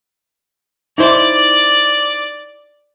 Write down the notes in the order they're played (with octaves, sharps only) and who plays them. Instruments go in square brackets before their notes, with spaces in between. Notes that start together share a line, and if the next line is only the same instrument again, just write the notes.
[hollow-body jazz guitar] D#4 E4 C5 [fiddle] D5